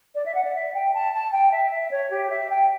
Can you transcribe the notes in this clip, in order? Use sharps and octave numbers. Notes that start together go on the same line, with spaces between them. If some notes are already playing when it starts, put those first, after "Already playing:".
D5
E5
F#5
D5
E5
G5
A5
A5
G5
E5
E5
C#5
G4
E5
G5